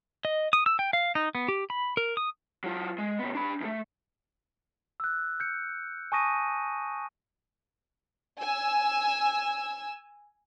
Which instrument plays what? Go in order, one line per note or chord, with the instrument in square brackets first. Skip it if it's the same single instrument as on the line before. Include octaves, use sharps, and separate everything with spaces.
[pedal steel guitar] D#5
D#6
E6
G5
F5
D#4
B3
G4
B5
A#4
D#6
[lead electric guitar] F#3 F4
G#3
C#3 B3
D4 B5
E2 A3
[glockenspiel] E6 F#6
G6 C#7
G#5 A5 C#6 D#6 A#6 D#7
[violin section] G#5 E6